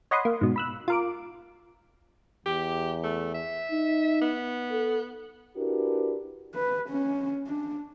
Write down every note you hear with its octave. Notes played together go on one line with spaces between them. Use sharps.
C#5 D#5 F#5 B5 C6 D#6
A#3
G#2 B2
B5 E6 F#6
F4 A#4 D6
E2 G4
A3
E5
D#4
B3
A4
D4 E4 F#4 G4 A#4 B4
B4
C#4
D4